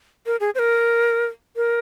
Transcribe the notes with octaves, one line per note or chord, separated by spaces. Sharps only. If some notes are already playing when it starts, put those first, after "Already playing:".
A#4
G#4
C5
A#4
A#4